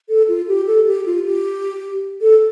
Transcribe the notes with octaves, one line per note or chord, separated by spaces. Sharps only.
A4
F4
G4
A4
G4
F4
G4
A4